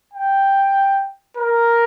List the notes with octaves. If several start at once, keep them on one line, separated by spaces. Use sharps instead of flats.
G5
A#4